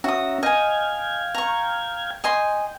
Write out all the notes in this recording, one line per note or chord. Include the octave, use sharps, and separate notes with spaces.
C#4 F#4 E5 A#5 D#6
D#5 F5 G5 G#5 G#6
A#5 C#6
D#5 G5 G#5 C6